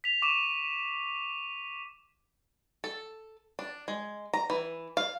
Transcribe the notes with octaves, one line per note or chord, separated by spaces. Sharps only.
B6 F7
C#6 D6 D#7 E7
A4
D4
G#3
A#5
E3
F5